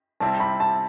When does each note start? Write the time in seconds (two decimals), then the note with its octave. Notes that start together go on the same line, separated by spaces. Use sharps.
0.20 C3 G3 C4 E4 A5
0.40 B5
0.60 A5